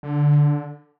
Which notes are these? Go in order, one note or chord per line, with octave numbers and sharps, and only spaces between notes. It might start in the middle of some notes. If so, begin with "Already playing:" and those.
D3